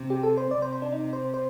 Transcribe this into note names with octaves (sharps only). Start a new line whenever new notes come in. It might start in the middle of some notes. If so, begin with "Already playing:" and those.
Already playing: C3
G4
A4
C5
C3 D5
C5
C5
D4
D#4
C5
C5